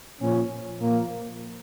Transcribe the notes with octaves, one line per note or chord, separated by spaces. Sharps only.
A#2 F3 C#4
A#2 F3 A#3